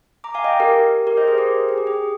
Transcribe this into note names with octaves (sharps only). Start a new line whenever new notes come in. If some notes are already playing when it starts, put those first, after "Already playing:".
A#5 D6
F5 G#5
D#5 G5
G4 A#4
G4 A#4
C5 D#5
G#4 C5
G4 A#4
G#4
G4
G#4